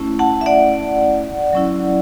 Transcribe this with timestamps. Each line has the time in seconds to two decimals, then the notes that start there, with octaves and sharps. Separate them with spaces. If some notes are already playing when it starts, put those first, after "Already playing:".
Already playing: A3 C#4 E4
0.19 F#5 A5
0.41 E5
0.46 D5 F#5
1.53 F#3 C#4 E4